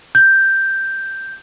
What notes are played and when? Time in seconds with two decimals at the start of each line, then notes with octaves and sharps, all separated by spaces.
0.15 G6